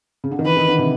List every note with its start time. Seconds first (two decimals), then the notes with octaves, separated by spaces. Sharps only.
0.24 C#3
0.31 D3
0.39 D#3
0.45 E3 B4
0.57 D#3
0.68 D3
0.78 C3